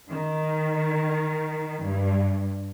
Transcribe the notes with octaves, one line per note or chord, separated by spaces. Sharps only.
D#3
G2